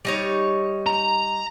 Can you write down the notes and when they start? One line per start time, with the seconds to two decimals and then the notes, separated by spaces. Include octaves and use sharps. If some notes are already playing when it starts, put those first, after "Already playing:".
0.05 G3 D#4 C#5
0.86 A#5